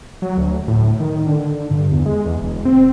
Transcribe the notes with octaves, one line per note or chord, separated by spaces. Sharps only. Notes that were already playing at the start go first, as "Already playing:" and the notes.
F#3
D2
A2
D#3
D3
G2
E2
G#3
E2
E1
C4